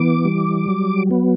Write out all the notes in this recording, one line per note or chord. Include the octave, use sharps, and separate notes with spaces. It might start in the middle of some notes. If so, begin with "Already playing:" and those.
Already playing: E3 B3 D6
G3
F#3
B3